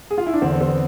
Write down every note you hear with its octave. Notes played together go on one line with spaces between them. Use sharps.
G#4
F4
E4
D4
E2 D3 C4
B3
C4